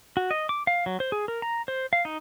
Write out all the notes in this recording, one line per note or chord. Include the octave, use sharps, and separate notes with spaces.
F#4
D#5
D6
F5
F#3
C5
G#4
A#4
A#5
C5
F5
D#4